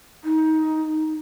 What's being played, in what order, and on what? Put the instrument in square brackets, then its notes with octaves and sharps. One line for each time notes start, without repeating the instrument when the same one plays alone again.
[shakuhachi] D#4